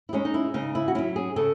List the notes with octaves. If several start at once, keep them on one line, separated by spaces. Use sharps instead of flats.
E4
G#3 C#4 D#4
D#4
E4
C#3 D#4
E4
F#4
F#3 C#4 E4
G#4
C#3 A4